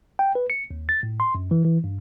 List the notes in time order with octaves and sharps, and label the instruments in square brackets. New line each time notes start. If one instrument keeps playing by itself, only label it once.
[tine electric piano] G5
B4
C#7
D#2
A6
A2
C6
F#2
E3
E3
G2